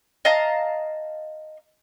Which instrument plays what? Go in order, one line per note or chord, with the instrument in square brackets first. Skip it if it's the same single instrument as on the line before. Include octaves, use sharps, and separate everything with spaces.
[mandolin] D#5 F5 A5 A#5